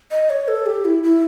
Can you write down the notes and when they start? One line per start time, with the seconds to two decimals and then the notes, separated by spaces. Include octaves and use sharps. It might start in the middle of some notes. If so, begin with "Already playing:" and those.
0.11 D#5
0.30 C#5
0.48 A4
0.66 G4
0.85 E4
1.03 E4